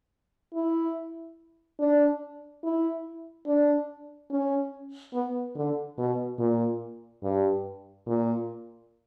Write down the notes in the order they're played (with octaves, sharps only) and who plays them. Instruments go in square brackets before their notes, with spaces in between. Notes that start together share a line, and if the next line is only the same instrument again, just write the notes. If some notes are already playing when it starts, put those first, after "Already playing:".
[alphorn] E4
D4
E4
D4
C#4
B3
D3
B2
A#2
G2
A#2